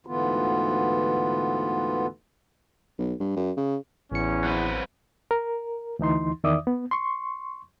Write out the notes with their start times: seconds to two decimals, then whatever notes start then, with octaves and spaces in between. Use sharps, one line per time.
0.07 D2 G#2 D3 E3 B3 F4
2.98 B1
3.20 G2
3.36 F#2
3.56 C#3
4.12 A1 E2 C#4 C#7
4.44 F#3 C4 B4
5.31 A#4
5.99 D2 E3 D#4 C6
6.44 E2 D#3 D5 E5 D6 D#6
6.67 B3
6.91 C6 C#6